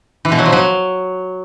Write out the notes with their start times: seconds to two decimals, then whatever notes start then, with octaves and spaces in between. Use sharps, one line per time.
0.25 E3
0.32 B2
0.39 F#3
0.46 F3
0.52 F#3